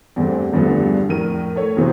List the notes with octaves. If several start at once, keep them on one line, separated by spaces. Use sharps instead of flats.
E2 G2 A3 C4
E2 G2 D3 F3 A3 B3
F2 A2 A#4 D#7
A3 C#5
B1 C3 E3 F#3 B3 C5